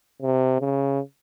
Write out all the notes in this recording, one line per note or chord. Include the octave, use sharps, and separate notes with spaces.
C3
C#3